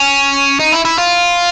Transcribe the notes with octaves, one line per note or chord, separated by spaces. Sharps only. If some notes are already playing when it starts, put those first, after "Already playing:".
Already playing: C#4
D#4
E4
E4
F4